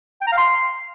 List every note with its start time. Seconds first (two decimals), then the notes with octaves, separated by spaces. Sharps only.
0.21 G5
0.27 A#5
0.32 F5
0.38 C6